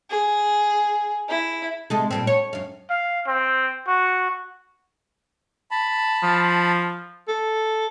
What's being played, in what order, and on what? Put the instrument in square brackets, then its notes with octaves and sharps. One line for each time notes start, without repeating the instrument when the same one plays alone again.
[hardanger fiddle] G#4
E4
[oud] C3 G#3 A4
A#2 G3 C4
C#5
F#2 F5
[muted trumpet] F5
C4
F#4
[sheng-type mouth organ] A5 B5
[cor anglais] F3
[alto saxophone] A4